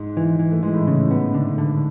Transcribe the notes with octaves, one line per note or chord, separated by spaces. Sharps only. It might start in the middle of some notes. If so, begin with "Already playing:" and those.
Already playing: G#2 G#3
E3
E3
A3
E3 G#3
A2 A3
C#3
B3
D3
D3